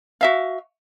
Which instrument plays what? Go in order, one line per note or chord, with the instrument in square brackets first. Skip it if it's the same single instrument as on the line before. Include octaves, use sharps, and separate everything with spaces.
[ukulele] F#4 E5 F5